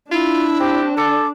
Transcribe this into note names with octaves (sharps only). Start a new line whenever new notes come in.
D4 E4 F4
C4 G4
D3 A4 D6